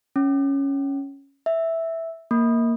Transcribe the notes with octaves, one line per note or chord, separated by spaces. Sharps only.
C#4
E5
A#3